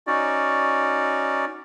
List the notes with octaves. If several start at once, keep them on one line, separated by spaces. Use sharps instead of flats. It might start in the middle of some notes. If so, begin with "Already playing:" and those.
C#4 D#4 F#4 D5